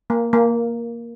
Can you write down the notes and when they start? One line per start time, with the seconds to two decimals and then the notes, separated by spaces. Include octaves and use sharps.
0.10 A#3
0.33 A#3